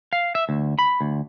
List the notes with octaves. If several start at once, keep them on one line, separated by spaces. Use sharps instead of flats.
F5
E5
D2
B5
D2